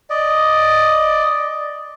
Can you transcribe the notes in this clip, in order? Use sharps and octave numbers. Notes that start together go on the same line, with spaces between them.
D5 D#5